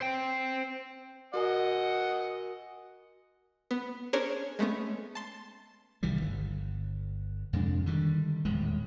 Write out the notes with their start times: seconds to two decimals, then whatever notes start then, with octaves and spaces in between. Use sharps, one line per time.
0.01 C5 G5
1.34 F#4 A#4 D#5 F#5 G#5
3.71 B3
4.13 C#4 D4 G#4 A#4 C5 C#5
4.59 G#3 A3 B3 C#4
5.15 A5 C6 A6
6.03 C2 D#3 E3 G3
6.22 G1
7.53 F2 C3 G#3 D4
7.86 D3 D#3 G3
8.45 D#1 E2 A2 G#3